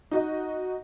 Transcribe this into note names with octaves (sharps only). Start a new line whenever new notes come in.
D#4 F#4 D#5